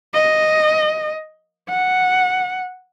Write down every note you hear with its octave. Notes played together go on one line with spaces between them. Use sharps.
D#5
F#5